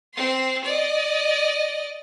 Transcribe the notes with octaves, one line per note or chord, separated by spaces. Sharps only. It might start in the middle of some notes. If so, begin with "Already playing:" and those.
C4 C6
D5 D#5